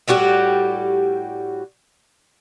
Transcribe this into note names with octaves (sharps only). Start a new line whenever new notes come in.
A2 G3 F#4 G4